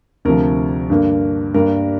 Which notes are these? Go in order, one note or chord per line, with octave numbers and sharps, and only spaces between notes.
D2 C3 F3 A#4
G2 D3 A#3
G2 G3 A#3 A#4